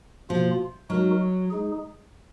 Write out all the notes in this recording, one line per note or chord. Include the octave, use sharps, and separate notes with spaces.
B2 F3 A#3 F4
F#3 G#3 D#4 F#4 A#4
G#3 D#4 G#4